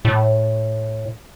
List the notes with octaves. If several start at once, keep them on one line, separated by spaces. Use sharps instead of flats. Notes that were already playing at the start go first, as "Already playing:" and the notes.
A2